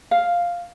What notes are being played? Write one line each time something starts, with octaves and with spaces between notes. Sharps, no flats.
F5